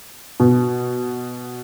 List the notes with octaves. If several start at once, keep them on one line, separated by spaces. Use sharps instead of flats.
B2